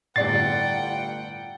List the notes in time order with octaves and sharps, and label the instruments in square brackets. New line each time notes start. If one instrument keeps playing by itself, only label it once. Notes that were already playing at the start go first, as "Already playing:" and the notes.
[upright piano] G1 D5 C7 [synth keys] A2 [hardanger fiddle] F#5 G5 [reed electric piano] A6